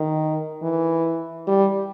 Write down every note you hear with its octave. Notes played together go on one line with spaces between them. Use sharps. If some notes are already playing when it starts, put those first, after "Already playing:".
Already playing: D#3
E3
G3